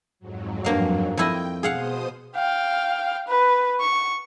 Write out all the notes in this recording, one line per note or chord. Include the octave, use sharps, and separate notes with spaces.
F2 G#2 F#3
G2 A#3 F5
F2 E4 D#5 G5
B2 G#4 C5 F5 F#5 D#6
F5 G5
B4
C#6